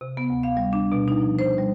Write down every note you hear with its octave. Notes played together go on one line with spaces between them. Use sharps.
C3
B3
D2
F5
G3
D4
B2
D#4
F3
C5
G3